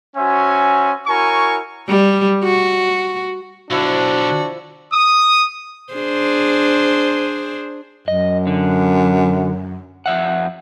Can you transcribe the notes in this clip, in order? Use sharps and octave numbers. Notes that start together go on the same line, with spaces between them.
C#4 F#4 C5 E5 G#5
E4 F#4 A#4 C#5 G#5 C#6
G3
F#4
B1 D3 F3 D4 E4 F#4
D#6
D4 G#4 C5
F#2 D#5
D3
F2 E5 F#5